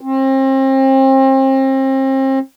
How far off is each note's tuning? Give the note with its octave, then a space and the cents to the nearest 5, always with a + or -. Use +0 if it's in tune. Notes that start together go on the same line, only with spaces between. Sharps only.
C4 +35